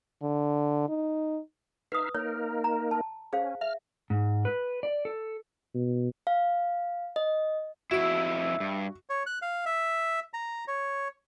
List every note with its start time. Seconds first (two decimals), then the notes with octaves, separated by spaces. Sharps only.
0.22 D3
0.89 D#4
1.92 D#4 B4 E5 F5 D#6
2.15 A#3 D#4 A#4 C#5
2.64 A#5
2.91 A5
3.33 C#4 G#4 C5 F5
3.61 E5 F6
4.10 G#2
4.45 B4
4.83 D5
5.05 A4
5.74 B2
6.27 F5
7.16 D#5
7.91 F2 C#3 E4 F#4 E5 E6
8.60 G2
9.10 C#5
9.26 F#6
9.42 F5
9.66 E5
10.34 A#5
10.68 C#5